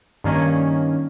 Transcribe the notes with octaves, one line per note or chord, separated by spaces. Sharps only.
G2 D#3 A#3 C#4